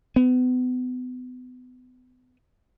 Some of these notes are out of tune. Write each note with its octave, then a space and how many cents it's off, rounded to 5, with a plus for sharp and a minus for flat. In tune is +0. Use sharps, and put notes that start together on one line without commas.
B3 +35